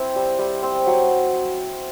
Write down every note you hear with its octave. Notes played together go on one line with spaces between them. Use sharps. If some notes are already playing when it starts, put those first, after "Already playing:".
Already playing: C4 E4 C5
G3
G3
C4
F#3